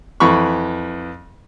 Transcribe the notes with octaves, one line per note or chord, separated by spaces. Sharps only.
F2 E3 B5 C#6